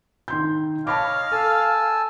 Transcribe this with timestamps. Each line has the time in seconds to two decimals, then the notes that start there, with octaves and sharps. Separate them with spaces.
0.28 D#3 C6 G6
0.87 C#5 D#5 F5 A5 B5 D6
1.31 A4 G#5 A5 E6